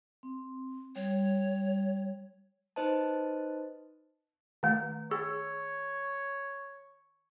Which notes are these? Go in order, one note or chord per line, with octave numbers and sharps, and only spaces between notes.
C4
G3 C#5
D#4 B4 C5 D#5 A5
D#3 A3
G#4 C#5